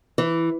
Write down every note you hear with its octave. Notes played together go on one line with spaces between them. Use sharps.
E3